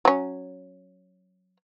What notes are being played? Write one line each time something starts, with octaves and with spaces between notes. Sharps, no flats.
F#3 C#4